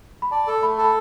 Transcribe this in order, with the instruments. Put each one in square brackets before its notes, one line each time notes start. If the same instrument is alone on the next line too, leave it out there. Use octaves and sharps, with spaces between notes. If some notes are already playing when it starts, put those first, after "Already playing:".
[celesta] B5
[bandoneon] D5 [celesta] A5
[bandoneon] A4
[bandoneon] A3 [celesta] B5
[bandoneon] A4
[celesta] B5